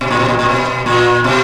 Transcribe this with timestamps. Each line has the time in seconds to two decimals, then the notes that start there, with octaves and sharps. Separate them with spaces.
0.01 B2
0.11 A#2
0.19 B2
0.28 A#2
0.39 A#2
0.49 B2
0.86 A#2
1.24 B2